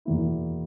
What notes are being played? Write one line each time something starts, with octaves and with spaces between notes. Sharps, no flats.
E2 B2 A#3 E4